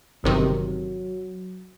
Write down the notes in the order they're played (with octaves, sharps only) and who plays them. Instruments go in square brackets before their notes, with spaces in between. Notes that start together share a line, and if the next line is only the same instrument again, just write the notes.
[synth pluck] G1 C3 D#3 [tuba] F#3